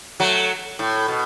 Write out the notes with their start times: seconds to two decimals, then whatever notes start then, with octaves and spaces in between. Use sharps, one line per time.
0.20 F#3 A3
0.79 A2
1.08 B2